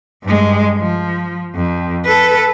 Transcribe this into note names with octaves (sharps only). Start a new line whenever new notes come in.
G2 G#3
F3
F2
A4 B4